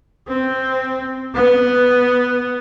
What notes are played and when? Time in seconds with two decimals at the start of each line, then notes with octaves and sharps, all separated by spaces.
0.28 C4
1.34 B3